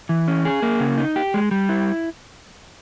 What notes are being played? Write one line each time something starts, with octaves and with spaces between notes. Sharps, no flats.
E3
C#4
G#4
A#3
C#3
D#4
G4
G#3
G3
E4